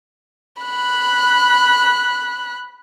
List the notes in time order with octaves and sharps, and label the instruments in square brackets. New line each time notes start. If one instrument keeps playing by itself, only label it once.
[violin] B5 F#6